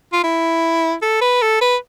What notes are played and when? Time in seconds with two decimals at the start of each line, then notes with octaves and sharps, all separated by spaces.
0.13 F4
0.24 E4
1.02 A4
1.21 B4
1.42 A4
1.61 B4